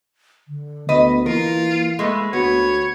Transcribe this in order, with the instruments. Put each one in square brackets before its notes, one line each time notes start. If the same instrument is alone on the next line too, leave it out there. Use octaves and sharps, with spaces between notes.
[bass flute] D3
[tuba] D2 [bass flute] B3 [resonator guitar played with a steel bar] B4 D#5
[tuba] E3 [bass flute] A#3 [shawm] F4 [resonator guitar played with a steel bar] A#4
[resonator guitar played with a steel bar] G#3 A3 B4
[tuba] D2 [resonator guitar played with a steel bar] B3 [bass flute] F#4 [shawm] C#5